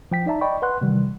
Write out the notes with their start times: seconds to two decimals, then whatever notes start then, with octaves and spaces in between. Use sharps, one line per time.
0.12 F3 G5 B6
0.26 D#4 D5 E5 A5 A#5
0.41 D5 D#5 G5 B5 C#6
0.62 B4 F#5 C6 F#6
0.81 C3 D#3 E3 G3